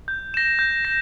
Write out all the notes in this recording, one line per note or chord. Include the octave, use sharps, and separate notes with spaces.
G6
A#6 E7
G6
A#6